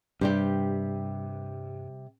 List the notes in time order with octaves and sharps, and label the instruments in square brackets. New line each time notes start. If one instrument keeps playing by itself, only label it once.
[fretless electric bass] G2 [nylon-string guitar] C3 G3 G4